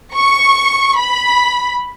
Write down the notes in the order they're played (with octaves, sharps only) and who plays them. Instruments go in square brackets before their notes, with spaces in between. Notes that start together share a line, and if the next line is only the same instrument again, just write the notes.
[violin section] C#6
B5